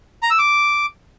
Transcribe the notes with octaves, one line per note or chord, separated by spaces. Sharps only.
A#5
E6
D6